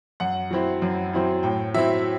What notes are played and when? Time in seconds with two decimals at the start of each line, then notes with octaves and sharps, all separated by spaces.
0.20 F#2 F#5
0.51 F#3 C4 E4
0.82 F#2
1.13 F#3 C4 E4
1.43 A2 G5
1.74 F#3 C4 E4 E5